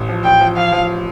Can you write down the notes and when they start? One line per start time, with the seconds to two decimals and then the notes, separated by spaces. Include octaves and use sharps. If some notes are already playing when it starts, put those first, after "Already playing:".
Already playing: A1
0.09 F3
0.24 A1 G5
0.41 F3
0.57 F3 F5
0.72 F3